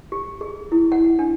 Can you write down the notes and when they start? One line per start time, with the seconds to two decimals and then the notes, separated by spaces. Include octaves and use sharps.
0.12 G4
0.41 G#4
0.72 E4
0.92 F#5
1.19 D4